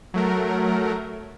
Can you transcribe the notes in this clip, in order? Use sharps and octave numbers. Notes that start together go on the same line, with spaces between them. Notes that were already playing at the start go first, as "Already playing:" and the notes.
F#3 A3 A#4